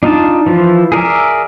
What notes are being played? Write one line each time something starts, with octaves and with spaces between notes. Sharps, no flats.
D4 D#4 F4 A5
E3 F3 F4
G#4 A#4 D5 E5